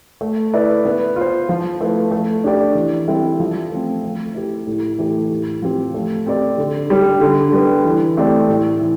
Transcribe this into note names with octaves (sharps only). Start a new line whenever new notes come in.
A3
E4 B4 D5
B3
F4 C5
F3
A3 E4 B4
A3
D4 G4 D5
E3
G3 C4 E4 A4
F3
A3 C4
A3
E4 G4
A2
E3 A3 E4 G4
A2
F3 C4 G4
A3
C4 G4 D5
D3
G3 D4 G4
D3
G3 B3
E3
A3 C4 G4 D5
A2
E3